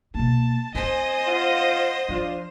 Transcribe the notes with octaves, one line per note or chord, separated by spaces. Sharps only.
B2 A#3 A5
C4 C5 D#5 G#5 D#6
F4 F#5
F3 D4 F4